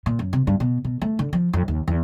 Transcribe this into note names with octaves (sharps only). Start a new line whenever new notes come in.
A#2
F#2
C3
G2
B2
B2
A3
D3
F3
F2
D#2
E2